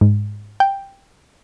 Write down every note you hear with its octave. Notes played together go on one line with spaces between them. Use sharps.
G#2
G5